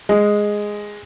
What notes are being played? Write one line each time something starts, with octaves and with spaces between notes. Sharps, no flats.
G#3